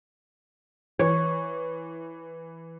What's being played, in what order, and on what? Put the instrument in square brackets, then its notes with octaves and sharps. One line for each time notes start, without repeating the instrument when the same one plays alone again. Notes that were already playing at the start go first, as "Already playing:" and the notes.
[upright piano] E3 [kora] C#5